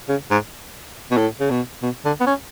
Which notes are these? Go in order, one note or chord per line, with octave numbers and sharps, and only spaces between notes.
C#3
G#2
B2
A2
C#3
B2
B2
D3
B3
C#4